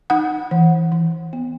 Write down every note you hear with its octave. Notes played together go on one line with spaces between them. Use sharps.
D#4 F#5
E3
E3
B3